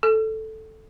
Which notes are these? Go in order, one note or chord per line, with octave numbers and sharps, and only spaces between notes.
A4